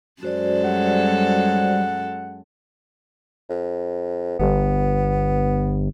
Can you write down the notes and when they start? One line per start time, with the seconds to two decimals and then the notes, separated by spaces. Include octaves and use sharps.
0.23 F#2 G#3 F#4 A4 C5 D5
0.64 G3 F#5
3.50 F2
4.40 G1 B3